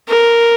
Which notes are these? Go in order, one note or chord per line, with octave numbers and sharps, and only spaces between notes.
A#4